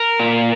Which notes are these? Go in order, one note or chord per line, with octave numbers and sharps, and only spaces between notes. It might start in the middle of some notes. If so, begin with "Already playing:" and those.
Already playing: A#4
A#2